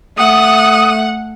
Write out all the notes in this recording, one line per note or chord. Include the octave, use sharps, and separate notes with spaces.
A3 F#5 D#6